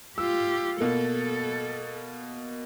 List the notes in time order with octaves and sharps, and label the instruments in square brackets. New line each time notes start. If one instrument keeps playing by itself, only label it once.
[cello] F4 G4 [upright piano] E6
[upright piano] B2 A#3 [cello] A4